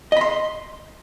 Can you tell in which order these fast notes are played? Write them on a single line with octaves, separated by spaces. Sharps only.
D#5 B5 C6